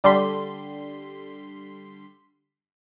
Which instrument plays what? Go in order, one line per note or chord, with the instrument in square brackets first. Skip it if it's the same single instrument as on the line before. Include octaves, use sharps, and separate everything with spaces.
[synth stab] D3 G3 C6 B6